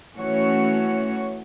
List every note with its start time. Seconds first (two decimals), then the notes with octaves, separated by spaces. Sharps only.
0.14 E3 A3 C#4 F#4 C#5